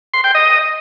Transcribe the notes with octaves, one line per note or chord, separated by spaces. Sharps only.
C6
G5
D#5